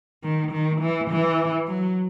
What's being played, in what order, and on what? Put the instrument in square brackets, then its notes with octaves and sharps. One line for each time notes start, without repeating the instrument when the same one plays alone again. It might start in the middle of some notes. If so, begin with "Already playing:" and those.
[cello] D#3
D#3
E3
E3
F#3